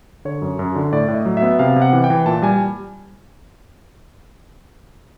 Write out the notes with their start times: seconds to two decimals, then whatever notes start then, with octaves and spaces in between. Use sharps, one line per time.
0.25 D3 C#5
0.42 F#2
0.59 F#2
0.76 D3
0.92 A2 D5
1.08 A2
1.14 D#5
1.26 F#3
1.37 E5
1.42 B3
1.59 C3 F5
1.76 C3
1.82 F#5
1.93 E3
2.04 G5
2.10 E3
2.26 A#2 A5
2.42 G3 G#5